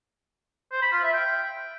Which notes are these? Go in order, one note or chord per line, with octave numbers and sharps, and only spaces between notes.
C5
B5
F4
E5
G5